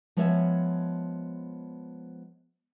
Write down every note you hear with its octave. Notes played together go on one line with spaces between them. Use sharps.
F3 G#3 B3 C#5 D#5 E5